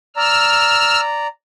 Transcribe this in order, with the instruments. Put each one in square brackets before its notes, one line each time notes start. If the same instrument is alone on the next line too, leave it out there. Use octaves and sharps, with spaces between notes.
[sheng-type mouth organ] D5 A#5 [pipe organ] E6 F6